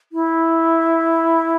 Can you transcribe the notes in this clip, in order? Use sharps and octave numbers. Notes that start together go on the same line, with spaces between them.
E4